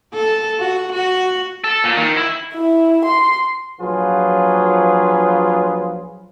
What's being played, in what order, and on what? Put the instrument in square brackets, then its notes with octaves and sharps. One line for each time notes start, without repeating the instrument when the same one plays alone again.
[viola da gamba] A4
F#4
F#4
[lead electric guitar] A4
A#2
D#3
E4
[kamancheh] E4
C6
[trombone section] A#1 F3 F#3 F4 G#4 B4